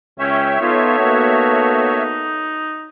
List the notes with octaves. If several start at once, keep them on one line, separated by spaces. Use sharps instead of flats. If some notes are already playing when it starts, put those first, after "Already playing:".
C#2 C#4 C#5 E5 G5
B3 D#4 F4 A4
A#3 B3 F#4